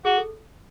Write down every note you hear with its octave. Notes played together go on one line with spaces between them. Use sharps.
F#4 G#4
A4